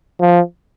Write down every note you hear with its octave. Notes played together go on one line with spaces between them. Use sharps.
F3